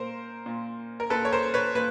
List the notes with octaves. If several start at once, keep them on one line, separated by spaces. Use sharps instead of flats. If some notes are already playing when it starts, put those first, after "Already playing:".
Already playing: A#2 A#4 C5
A#2
A#4
A#2 A4 B4
C#5
A#4 C5
B4 C#5
A#2 B4